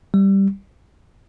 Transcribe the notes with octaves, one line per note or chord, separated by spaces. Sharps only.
G3